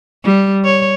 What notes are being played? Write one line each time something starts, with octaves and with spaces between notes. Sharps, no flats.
G3
C#5